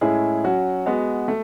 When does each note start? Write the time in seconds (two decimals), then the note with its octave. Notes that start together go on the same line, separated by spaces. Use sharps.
0.01 A2 G#3 C#4 E4 G#4
0.44 F#3 C#4 F#4
0.86 G#3 B3 F#4
1.28 A3